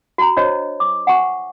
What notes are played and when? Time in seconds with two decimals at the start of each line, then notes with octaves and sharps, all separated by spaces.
0.18 F#4 A#5
0.37 D4 F#4 C5 C#5 D#5
0.80 D6
1.07 F#5 G#5 C#6